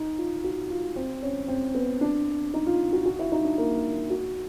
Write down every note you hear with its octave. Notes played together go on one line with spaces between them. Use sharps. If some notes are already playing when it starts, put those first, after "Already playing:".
Already playing: D#4
F4
F#4
F4
C4
C#4
C4
B3
D4
D#4
F4
F#4
F#4
E4
D#4
D4
A#3
F#4